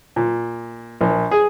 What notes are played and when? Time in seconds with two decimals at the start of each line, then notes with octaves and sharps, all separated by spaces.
0.16 A#2
1.01 A#1
1.31 G#4